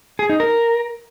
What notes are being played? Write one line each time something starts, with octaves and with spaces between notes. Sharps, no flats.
G#4
D#4
A#4